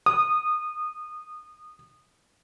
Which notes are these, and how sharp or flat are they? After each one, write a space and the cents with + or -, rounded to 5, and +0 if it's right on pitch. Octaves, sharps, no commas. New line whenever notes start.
D#6 -25